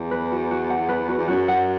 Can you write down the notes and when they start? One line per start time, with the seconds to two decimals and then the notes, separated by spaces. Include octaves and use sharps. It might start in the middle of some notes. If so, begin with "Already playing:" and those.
Already playing: E2
0.11 B4
0.32 F#4
0.51 F#4
0.70 F#5
0.89 B4
1.09 F#4
1.18 E2
1.28 F#2 F#4
1.48 F#5